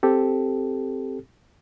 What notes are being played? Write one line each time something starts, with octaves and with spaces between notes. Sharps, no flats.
C4 G4 A4